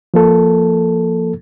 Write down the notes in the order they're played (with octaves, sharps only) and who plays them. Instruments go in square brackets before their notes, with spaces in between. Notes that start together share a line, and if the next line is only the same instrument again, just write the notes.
[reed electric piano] F3 A#3 A4